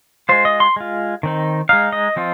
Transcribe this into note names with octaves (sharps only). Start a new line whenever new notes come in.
G#3 F4 C5
D#5
C6
G#3 F4
D#3 C4 D#4
G#3 D#4 F5
D#5
F3 C4 F4